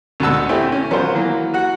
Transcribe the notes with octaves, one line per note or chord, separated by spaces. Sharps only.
D2 G#2 B2 F#4 A5 E6
A3 C4 E4 G4 G#5
C#4
F#3 B3 F4 C5
E3 F#3 A#3
F#4 F#5